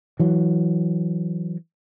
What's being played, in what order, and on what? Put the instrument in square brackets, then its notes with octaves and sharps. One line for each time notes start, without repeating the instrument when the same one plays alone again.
[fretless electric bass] E3 F#3